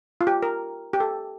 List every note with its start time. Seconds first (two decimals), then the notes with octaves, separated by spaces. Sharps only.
0.21 F4
0.27 G4
0.43 A#4
0.93 G4
1.00 A4